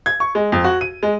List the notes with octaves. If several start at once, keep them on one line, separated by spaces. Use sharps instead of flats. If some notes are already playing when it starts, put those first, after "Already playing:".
G#6
C#6
G#3
F2
F#4
D#7
G#3